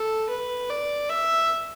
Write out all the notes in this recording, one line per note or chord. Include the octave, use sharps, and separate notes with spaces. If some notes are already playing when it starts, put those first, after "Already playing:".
Already playing: A4
B4
D5
E5